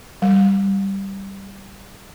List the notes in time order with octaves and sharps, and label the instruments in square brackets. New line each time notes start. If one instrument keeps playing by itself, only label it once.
[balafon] G3